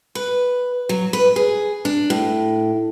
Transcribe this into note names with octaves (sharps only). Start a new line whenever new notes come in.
B4
F#3
B4
G#4
D4
A2